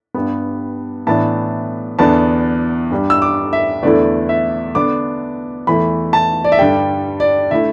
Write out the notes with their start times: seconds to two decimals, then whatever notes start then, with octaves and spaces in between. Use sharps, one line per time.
0.14 G2 G3 B3
1.07 A2 E3 B3 D4 A5
1.99 E2 D3 B3 D4 A5
2.90 G2 G3 D4
3.10 E6
3.22 D6
3.53 E5
3.83 E2 D3 A3 E4 D5
4.29 E5
4.75 D3 B3 D4 D6
5.67 E2 E3 A3 B5
6.13 A5
6.44 D5
6.52 E5
6.59 G2 D3 G3 G5
7.20 D5
7.51 D3 A3 E4 E5